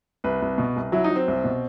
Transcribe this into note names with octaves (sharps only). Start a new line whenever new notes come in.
C2 B4
C2
B2
C2
F#3 E4
D#4
F#3
C4
C2
B2